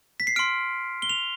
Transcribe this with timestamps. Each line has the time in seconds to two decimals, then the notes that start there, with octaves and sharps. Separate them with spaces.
0.20 B6
0.27 C7
0.36 C6 F6 D7
1.02 G7
1.09 F7